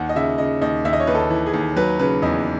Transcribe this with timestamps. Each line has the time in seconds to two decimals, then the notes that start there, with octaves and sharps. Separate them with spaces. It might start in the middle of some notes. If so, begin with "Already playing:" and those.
Already playing: D#2 F#5
0.09 D#5
0.16 C#3 E5
0.38 C#3 D#5
0.61 D#2 D#5
0.85 D#2 E5
0.93 D#5
1.00 C#5
1.07 D#2 B4
1.15 A4
1.30 E3
1.46 G#4
1.53 D#2
1.76 F#3 B4
1.99 C#3 B4
2.22 E2 D#5